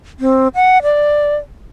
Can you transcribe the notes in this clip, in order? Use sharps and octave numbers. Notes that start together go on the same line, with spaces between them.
C4
F#5
D5